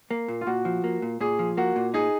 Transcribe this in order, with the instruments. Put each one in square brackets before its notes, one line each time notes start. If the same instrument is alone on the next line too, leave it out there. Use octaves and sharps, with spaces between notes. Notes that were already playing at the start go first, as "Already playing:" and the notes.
[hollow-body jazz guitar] A#3
A#2
[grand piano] F4
[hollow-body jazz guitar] A#2 [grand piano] F#4
[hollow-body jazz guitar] F3
A#3
A#2
[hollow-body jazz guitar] A#2 [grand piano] G#4
[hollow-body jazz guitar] F3
[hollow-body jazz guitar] A#3 [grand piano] F#4
[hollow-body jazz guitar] A#2
[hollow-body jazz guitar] D#4 [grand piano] G#4